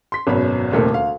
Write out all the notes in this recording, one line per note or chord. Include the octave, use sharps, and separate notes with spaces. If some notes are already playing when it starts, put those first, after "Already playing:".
C6 B6
G#1 F#2 B2 F#3 B5
D#1 D#2 C3 A3 A#4
D2 F5